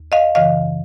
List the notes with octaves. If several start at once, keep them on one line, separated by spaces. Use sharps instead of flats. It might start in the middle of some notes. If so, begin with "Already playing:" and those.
Already playing: D#2
D#5 F5
F#2 C#3 E3 D#5 F5